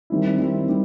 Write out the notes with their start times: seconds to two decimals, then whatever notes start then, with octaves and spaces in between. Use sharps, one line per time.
0.10 D#3 G3 C4 E4
0.39 D#3 G3 C4 E4
0.68 D#3 G3